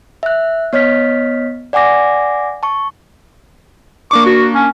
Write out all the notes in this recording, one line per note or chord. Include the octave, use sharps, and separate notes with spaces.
E5 F#6
B3 C#5 D#5 F6 B6
D5 F#5 G#5 D6 A#6
A5 C#6
A#3 D4 C#6 D6
F#4
C#4